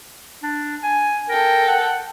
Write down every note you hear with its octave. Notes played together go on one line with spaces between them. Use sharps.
D4
G#5
A4 A#4 G5
F#5